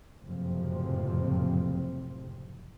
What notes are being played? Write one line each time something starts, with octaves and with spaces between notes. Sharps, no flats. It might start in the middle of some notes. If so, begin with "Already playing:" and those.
F#1 F2 A2 C3 F3 C4